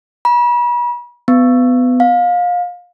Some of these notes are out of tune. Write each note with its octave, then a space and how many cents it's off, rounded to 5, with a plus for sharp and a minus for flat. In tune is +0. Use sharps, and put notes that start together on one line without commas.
B5 -40
B3 +25
F5 +25